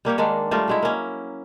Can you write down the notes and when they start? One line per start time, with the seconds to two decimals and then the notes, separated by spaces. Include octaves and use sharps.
0.05 G3 A#3 G4 C#5
0.18 D#3 G#3 A#3 D4
0.51 G3 A3 F4 A#4
0.68 F#3 G#3 E4
0.82 A#3 C#4